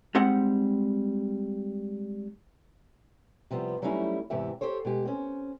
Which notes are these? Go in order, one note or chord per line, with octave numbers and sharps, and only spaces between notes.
G3 G#3 C4 D#4 F#5
C3 F3 G3 B3
F#3 G3 A3 C#4 D#4 E4
E2 G#2 C3 E3 G4 E5
G4 A4 C5 C#5
B2 G#3 G4
C4 C#4